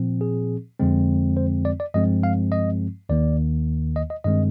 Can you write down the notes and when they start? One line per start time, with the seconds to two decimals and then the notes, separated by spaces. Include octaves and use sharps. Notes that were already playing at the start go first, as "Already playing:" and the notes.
Already playing: A#2 F3 C4
0.21 G#4
0.79 F2 D3 F3 G#3 C4
1.37 C5
1.65 D5
1.80 D5
1.94 G2 F3 G#3 C4 D#5
2.23 F5
2.52 D#5
3.09 D#2 D#3 A#3 D5
3.96 D#5
4.10 D#5
4.24 G2 D#3 G#3 C4 D#5